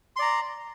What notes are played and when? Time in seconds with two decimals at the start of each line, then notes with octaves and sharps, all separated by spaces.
0.16 C6
0.19 D5
0.22 A#5